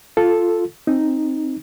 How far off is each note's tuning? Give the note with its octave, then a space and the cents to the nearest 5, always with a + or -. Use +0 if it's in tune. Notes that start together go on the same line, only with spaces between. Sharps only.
F4 +0 A4 +0
C4 +15 D#4 +0